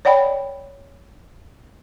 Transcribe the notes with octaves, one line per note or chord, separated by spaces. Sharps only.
C#5 D5 F#5 G5 B5